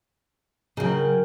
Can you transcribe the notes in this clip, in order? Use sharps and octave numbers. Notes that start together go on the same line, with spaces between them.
C#3 F#3 A#4 G5 G#5